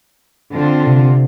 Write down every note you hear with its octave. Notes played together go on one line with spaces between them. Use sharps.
D3 C4 F4
C3